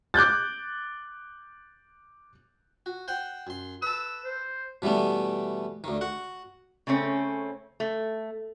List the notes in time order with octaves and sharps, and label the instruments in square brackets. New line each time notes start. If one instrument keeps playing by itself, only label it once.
[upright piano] D6 F#6 G6 A6
[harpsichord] F#4
C5 F#5 G5
F#2 C6
[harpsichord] A4 B4 [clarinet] E6
[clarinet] C5
[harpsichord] B2 E3 G3 A3 B3
D2 D#3
F#4 F#5
[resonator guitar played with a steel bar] C#3 A3 C4 C#4
A3